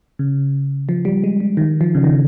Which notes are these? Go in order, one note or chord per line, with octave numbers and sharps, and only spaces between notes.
C#3
F3
G3
G#3
G3
D#3
F3
C#3
D#3